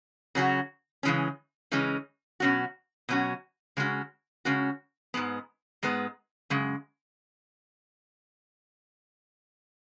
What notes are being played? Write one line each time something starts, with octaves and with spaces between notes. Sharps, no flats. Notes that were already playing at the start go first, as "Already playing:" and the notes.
C#3 F#3 C#4 F#4
C#3 E3 G#3 C#4
C#3 E3 G#3 C#4
B2 F#3 C#4 F#4
B2 F#3 C#4 F#4
C#3 G#3 C#4 F#4
C#3 G#3 C#4 F#4
G#2 G#3 B3
G#2 G#3 B3
F#2 C#3 G#3